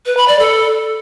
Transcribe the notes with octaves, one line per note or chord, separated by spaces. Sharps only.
B4
B5
D5
A4